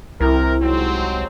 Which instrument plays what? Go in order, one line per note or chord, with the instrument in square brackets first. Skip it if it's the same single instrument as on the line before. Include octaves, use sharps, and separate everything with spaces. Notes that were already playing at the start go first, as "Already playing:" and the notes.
[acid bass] C2 [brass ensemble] C3 A#4 [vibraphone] E4
[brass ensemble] G#2 F#3 C4